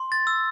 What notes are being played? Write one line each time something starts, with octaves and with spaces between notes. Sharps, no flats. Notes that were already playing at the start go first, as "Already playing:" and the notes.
Already playing: C6
A6
E6